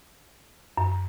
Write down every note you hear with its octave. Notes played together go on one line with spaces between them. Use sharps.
F#2